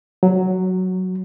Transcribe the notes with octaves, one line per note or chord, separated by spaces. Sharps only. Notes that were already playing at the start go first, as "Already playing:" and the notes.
F#3